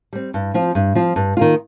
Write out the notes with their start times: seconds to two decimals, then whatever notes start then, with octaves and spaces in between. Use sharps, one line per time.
0.13 G3 C4
0.34 G2
0.54 F3 C4 F4
0.75 G2
0.95 F3 C4 F4
1.16 G2
1.37 D#3 A#3 F4